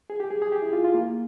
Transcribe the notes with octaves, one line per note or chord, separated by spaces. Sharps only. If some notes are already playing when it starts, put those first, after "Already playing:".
G#4
G4
G#4
G#4
G4
E4
F4
F4
A#3